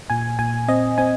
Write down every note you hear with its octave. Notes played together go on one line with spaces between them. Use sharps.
A#2 G#5
A#2 G#5
C4 D#5
C4 G#5